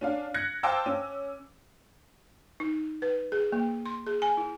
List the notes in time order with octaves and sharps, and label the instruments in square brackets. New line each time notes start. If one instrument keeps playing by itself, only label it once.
[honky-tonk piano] C#4 D4 F5
F#6 G#6 A#6 C#7
C5 F5 G5 A5 D6 E6
C#4
[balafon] D#4
B4
G#4
A#3
C6
G#4
G#5
E4